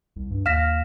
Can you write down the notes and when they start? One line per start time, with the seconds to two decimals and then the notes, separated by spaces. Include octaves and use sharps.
0.16 C2
0.30 G2
0.46 D#2 F5 F6 A#6 B6 E7